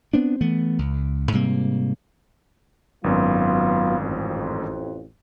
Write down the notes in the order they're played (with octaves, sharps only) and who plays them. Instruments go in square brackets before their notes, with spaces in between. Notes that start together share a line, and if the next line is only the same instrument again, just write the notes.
[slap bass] B3 C4 D4
E3 A3 B3
C#2
G#2 C3 G3 A#3
[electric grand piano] G#1 F#2 [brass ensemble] F#3 B3 F4
[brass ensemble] A1 F2